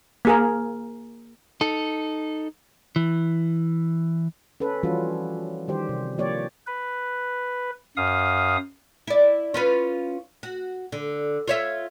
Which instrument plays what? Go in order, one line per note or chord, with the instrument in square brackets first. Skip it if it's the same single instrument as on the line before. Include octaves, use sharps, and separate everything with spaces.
[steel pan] A#3 G#4 A#4
[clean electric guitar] D#4 A4
E3
[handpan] C#4 A4 B4
E3 F3 G3 C#4 F4 F#4
D#3 G3 G4 C5
C3
F3 A#3 G4 C#5 D5
[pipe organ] B4
F#2 F5 D#6
[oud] E4 D5
C#4 F4 B4
F#4
D3
F4 C#5 E5